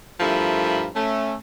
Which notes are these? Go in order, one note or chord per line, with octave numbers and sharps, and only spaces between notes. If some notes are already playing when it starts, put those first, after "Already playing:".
G2 F3 A3 E4 A#4 B5
A3 C#4